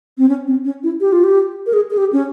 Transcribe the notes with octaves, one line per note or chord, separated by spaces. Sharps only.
C4
C#4
C4
C#4
E4
G4
F4
G4
A#4
G#4
G#4
G4
C#4